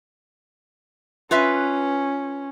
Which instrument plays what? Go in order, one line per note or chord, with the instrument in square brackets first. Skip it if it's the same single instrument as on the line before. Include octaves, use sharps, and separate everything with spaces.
[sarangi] C#4 [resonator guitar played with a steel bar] F4 B4 E5